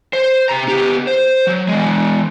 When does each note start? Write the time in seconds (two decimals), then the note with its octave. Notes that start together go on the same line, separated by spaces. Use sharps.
0.13 C5
0.49 C3 A#5
0.68 B3 G4
1.07 C5
1.47 F#3
1.68 E3 G#3